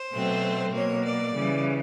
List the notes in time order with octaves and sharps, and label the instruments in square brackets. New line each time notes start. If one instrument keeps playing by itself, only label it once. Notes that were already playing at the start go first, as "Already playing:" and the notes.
Already playing: [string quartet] C5
B2 F#3 A3 C4
B2 F#3 A#3 C#5
D5
C#3 E3 G3